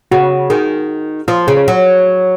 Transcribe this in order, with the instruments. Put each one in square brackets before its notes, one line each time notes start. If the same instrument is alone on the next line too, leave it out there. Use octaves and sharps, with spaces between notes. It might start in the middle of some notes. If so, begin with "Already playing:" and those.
[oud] C#3 [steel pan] F#4
[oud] D#3 [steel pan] G#4
[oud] F3 [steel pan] F4
[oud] C#3 [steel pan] G#4
[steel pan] C#5
[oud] F#3